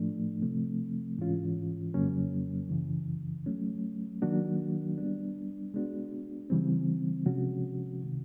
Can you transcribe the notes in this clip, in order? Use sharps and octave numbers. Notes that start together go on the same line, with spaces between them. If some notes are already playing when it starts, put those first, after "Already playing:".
Already playing: A2 F3 A3 D4
C3 F3 A3 C4
G#2 E3 G#3 C#4 F4
F2 C#3 F#3 A#3 C#4
F#2 C#3 E3
F#3 A3 C#4
D#3 F#3 A#3 D4 F#4
G3 B3 D4
G#3 B3 D4 F#4
C#3 E3 G3 C4
C3 F3 G#3 C#4 F#4
C3 D#3